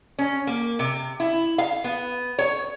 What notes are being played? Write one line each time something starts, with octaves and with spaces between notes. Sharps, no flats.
C#4
A#3
C3
E4
F5
B3
C#5